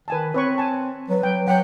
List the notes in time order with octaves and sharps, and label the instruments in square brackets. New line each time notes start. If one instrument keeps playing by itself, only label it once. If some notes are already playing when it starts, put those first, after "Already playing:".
[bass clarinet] D#3 [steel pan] B4 G#5 A5
[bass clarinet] C4 [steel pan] B4 C#5 C#6
[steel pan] G#5 A5
[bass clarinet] F#3 [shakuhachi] B4
[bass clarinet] F#3 [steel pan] G5
[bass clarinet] F#3 [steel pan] F#5 [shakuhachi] G5